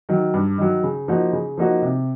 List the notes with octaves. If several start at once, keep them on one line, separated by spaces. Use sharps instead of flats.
D#3 F#3
G2
D#3 F#3
C#3
F3 A#3 D#4 F#4
C#3
F3 A#3 D#4 F#4
C3